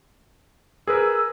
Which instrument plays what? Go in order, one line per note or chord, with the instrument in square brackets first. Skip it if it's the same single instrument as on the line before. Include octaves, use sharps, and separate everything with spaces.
[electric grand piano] G#4 A#4 B4 [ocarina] E6